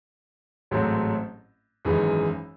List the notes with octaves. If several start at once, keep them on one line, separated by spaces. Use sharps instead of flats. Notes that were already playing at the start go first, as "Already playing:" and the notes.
A1 G#2 F#3 A3 C4
G#1 F#2 E3 G#3 D#4